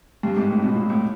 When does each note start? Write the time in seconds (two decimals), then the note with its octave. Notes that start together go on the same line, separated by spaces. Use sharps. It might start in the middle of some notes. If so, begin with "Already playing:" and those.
0.23 G2
0.36 G#2
0.50 A2
0.63 B2
0.75 A#2
0.90 A2